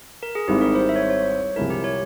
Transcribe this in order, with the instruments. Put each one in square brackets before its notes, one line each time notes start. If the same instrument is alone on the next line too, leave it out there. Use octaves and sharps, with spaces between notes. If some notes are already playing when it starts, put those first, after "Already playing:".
[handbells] A#4
G#4
[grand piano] G#1 G#2 G3 C4 E4 [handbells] G4
[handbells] A#4
C5
E5
C#5
C5
C#5
[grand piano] C2 C3 F3 G#3 E4 [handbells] A#4
[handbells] G4
C#5